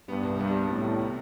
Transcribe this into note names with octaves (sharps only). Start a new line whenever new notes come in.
G2 B3
C2
G2 B3
B3
A2 C3
G3
C3